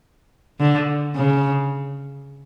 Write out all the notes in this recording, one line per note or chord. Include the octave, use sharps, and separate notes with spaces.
D3
C#3